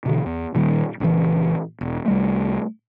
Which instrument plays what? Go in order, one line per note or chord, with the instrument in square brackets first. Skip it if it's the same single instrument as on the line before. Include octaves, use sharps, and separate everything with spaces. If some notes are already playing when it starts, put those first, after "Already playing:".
[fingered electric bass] B2 D3 E3
E2
A#2 D#3 G3
A#1 C#3 E3
E1
C2 G3 A3